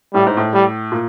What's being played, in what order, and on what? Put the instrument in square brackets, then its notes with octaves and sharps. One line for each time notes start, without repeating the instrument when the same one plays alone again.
[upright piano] A2 [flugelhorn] G3
[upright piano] G#2
A2
[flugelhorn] G3
[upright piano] A#2